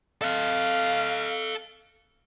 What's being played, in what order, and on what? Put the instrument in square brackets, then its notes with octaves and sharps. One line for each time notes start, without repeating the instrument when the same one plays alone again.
[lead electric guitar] A4 D#5 [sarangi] F5